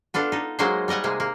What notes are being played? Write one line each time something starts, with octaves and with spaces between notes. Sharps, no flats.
B3 D4 F4 A4
D#4 A4
F#3 G#3 A#3 D#4 G#4 C5
G3 A#4 D#5 F#5 G#5
C3 G#3 A#3
A#3